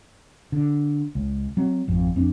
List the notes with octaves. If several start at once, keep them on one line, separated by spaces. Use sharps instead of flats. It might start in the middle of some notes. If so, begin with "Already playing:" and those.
D3
C#2
F#3 C4
G#1 F2
F2 C4 D4